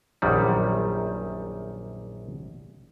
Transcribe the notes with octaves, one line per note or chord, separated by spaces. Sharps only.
A#1 F#2 D#3 G3